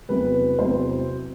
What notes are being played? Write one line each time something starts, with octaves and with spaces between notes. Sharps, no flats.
E2 C3 F#3 C4 B4
E2 C3 F#3 C4 C5